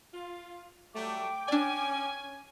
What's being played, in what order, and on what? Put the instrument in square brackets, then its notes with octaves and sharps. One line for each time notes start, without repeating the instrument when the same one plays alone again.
[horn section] F4
[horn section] F#3 G3 A3 [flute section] G5 D6
[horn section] C#4 G#5 [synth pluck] D4 D5